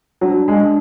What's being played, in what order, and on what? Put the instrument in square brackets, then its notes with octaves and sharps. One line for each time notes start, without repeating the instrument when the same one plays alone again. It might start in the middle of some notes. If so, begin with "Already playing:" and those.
[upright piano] F#3 [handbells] D4
[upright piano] G#3
[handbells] D4